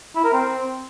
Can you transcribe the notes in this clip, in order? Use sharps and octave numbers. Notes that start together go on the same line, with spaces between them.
E4
A#4
C4